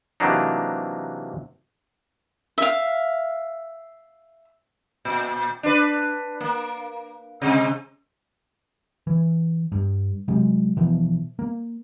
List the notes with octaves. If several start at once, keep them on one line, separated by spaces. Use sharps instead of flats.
C3 E3 F#3 A#3 D4 D#4
E5 F5
A#2
D4 B4
A#3
C3 G#3
E3
G2
C3 F#3 G#3
B2 E3 F3
A#3